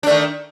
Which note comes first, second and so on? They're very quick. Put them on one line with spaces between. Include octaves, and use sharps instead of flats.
D4 A3 D#3